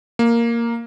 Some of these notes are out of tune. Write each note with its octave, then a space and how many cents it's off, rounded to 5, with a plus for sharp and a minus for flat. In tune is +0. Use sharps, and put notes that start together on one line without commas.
A#3 -5